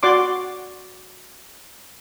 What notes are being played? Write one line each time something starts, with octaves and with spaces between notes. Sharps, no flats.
F#4 D5 C6 D6